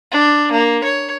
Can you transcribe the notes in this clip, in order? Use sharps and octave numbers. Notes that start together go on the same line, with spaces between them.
D4
A#3
C#5